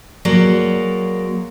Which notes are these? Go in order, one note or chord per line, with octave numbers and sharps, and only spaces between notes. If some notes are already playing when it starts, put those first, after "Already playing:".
F#3 G#3 A#3 D5